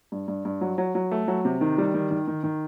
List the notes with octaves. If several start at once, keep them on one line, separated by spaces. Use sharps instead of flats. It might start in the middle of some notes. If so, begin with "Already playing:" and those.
G2
G2
G2
F#3
F#3
F#3
A3
F#3
C3
D#3
G3
D#3
D#3
D#3
D#3